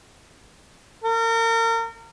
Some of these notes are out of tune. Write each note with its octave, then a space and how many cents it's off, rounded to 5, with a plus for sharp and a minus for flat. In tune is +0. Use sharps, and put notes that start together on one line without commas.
A#4 -35